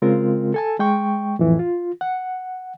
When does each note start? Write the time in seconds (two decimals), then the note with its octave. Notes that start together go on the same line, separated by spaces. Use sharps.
0.02 C#3 G#3 C4 F4 A#4
0.54 A4 G#5 A5
0.79 G#3 G5 C#6
1.39 F2 A2 E3
1.59 F4
2.01 F#5